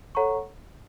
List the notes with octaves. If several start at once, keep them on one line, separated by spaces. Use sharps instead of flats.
A4 C#5 F#5 A#5 C#6